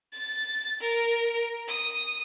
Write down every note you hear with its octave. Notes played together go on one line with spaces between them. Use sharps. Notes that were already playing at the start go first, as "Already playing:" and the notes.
A6
A#4
D#6